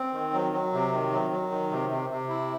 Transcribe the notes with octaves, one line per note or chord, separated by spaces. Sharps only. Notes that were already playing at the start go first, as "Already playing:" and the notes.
Already playing: C4
D#3
F#3
F#3
C3
D#3
F#3
F#3
D#3
C3
C3
C3
E4